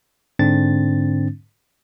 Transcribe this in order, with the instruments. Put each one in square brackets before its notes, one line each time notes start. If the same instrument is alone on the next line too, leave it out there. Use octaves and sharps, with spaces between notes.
[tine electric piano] G#2 D3 C4 D4 A6